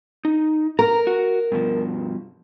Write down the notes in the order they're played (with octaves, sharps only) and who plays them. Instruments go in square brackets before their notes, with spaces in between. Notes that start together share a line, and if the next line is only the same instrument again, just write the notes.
[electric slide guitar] D#4
[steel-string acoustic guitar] A#4 [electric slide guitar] A#5
[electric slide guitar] F#4
G2 B2 F3